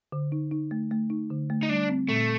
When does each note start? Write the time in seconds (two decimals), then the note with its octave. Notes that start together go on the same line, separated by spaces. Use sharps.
0.12 D3
0.32 D#4
0.51 D#4
0.71 A3
0.91 A3
1.10 D#4
1.31 D3
1.50 A3
1.63 D#4
1.69 G3 D4
1.89 C4
2.09 A#2 A3